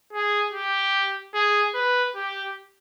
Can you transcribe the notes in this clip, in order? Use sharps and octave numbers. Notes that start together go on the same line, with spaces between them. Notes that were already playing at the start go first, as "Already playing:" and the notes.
G#4
G4
G#4
B4
G4